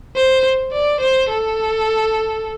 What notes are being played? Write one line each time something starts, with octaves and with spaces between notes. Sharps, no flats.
C5
D5
C5
A4